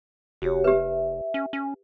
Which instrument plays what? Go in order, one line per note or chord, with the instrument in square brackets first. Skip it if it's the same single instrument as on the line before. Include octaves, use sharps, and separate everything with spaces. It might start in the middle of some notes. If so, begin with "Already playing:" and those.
[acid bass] F1 [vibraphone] F#4 G4 C#5
[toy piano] G4 B4 [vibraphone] E5
[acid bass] C#4
C#4